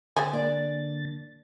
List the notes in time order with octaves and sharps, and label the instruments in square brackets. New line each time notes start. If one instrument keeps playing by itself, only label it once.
[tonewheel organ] D3 A6 [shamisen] G#3 C4 G#4
[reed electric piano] A#3 [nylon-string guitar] D4 D5